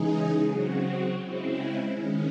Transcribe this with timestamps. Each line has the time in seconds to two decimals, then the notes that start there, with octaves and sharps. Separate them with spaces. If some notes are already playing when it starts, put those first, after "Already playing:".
Already playing: C#3 E3 G#3 D#4 G#4
0.46 C#3 F#3 C4 F#4
1.18 C#3 G#3 C4 E4
1.90 D#3 G#3 C#4